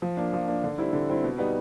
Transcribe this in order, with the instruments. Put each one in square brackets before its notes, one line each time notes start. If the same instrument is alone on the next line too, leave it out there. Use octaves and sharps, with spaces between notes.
[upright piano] F3
A#3 D4
F3
A#3 D4
D3
G3 C4 E4
D3
G3 C4 E4
B2
G3 B3 D#4